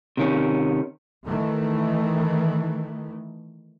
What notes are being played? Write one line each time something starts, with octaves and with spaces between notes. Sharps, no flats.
C3 D#3 C#4
D#3 E3 A3